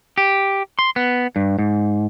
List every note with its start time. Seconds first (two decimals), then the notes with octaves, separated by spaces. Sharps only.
0.18 G4
0.79 C6
0.96 B3
1.36 G2
1.59 G#2